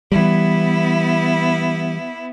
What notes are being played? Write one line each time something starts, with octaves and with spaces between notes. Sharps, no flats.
E3 G3 B3 E4